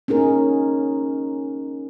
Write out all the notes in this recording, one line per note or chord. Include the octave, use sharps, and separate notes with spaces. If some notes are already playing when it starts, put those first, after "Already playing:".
C#4 D#4 G#4 A#4